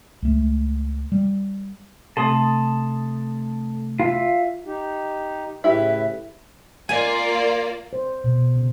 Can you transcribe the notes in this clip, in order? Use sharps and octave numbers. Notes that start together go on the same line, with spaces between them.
C#2 A3
G3
C3 A3 A4 A5 C6 D#6 A6
F4 E5
D#4 G4
A2 C#3 E4 G4 B4 E5
A#3 F4 D5 G#5
C5
B2
C#3